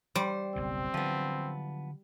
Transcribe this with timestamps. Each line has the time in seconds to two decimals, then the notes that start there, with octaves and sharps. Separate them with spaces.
0.15 G3 C5
0.56 F#1 B1 B2 C4
0.94 D3 F3 F#3 B3